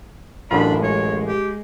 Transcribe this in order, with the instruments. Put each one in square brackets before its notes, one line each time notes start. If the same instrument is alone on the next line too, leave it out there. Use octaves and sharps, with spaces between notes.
[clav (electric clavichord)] A1 F#2 F4 [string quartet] D4 [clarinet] B5
[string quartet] G#3 [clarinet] C#5
[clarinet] G4